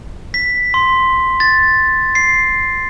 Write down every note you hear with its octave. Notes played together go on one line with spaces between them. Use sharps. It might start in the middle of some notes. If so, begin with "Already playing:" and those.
B6
C6
A6
C7